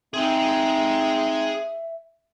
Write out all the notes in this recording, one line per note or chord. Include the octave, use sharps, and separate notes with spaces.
C4 D#4 G#4 D#5 E5